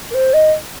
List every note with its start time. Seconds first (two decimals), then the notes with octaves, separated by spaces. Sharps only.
0.10 A#4
0.14 C5
0.33 D#5